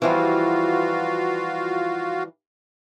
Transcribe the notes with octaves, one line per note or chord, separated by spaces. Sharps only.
E3 F3 G3 F4 F#4 F5